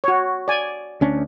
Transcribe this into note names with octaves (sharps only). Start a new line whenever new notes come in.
F#4 C#5
D5 G#5
D2 C#4 D4